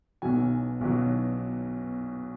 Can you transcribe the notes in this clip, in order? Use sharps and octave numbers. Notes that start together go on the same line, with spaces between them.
B1 B2 F#3 G#5
B1 B2 F#3